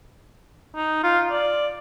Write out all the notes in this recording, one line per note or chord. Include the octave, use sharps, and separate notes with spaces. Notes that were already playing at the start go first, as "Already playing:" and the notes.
D#4
F4
D5